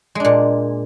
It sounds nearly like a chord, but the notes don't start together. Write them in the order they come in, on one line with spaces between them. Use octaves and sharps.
G#3 D4 A#2